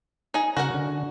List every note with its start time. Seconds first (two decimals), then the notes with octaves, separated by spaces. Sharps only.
0.34 D#4 G#4
0.57 C#3 F#4 A#4 F#5
0.74 D3